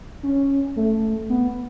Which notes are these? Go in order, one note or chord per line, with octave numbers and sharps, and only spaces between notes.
C#4
A3
B3